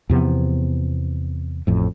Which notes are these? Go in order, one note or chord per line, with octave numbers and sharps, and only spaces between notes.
E2 C3 F3 B3
A1 F2 A2